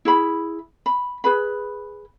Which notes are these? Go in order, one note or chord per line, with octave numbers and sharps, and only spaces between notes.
E4 G#4 B5
B5
G#4 B4 B5